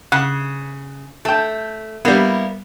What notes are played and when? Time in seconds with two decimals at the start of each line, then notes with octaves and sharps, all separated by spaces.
0.12 C#3 F#5
1.25 A3 G5 A5
2.05 G3 A#3 B3 E4